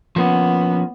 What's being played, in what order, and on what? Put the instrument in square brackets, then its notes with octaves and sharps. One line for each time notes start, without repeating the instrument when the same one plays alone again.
[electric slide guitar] F3 A#3 C#4 [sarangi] B3